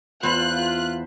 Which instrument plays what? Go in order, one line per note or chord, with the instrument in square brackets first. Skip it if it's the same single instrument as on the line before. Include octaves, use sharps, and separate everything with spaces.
[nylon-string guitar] E2 [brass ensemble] F4 [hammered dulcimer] C5 B5 [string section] F#6